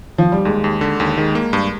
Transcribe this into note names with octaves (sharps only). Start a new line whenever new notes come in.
F3
G3
D#2 G#3
D#2
D3
D#2
D#3 G#3
A#3
G2